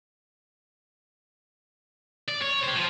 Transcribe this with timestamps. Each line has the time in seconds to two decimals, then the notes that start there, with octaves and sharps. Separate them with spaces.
2.29 D5
2.42 C#5
2.64 G4 C5
2.77 F3